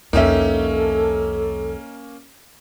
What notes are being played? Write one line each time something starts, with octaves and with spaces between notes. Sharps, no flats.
C2 F2 A#3 C#4 D#4 G4 A4 E5